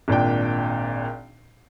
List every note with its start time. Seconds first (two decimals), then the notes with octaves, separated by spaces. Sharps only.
0.08 G#1 A#2 D4 G5